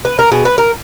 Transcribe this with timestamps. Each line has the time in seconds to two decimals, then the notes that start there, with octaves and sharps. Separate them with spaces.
0.05 B4
0.19 A#4
0.32 B2 G#4
0.45 B4
0.58 A#4